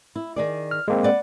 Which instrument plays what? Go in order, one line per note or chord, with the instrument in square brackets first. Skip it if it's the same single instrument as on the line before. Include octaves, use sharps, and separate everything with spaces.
[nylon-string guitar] E4
D#3 G#4 D5
[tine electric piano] F6
G#3 A#3 C4
[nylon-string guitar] B4 D5 F#5